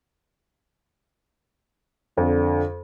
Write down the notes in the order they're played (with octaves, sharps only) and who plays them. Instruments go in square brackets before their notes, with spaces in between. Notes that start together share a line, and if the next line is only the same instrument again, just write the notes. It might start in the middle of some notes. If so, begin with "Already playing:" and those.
[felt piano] F2 [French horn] D3